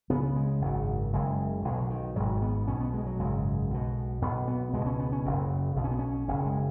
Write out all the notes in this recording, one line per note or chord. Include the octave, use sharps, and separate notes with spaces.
C#2 C#3 B3
G#3
G#1 F#2 C#3
F#1 F#2 C#3 G#3
B1 B2 F#3
D#3
G#1 G#2 F#3
B3
B1 B2 C#4
B3
G#3
F#3
G#1 F#2 C#3 G#3
B1 B2
B1 B2 B3
B3
C#2 B2 G#3
C#4
B3
C#4
F#1 F#2 C#3
B1 B2
C#4
B3
C#4
F#1 F#2 C#3 C#4
G#3